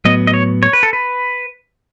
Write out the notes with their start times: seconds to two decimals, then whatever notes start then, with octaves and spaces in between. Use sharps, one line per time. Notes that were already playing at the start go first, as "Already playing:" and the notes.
0.05 A2 F#3 B3 D#5
0.27 D#5
0.34 C#5
0.63 C#5
0.73 B4
0.83 A4
0.93 B4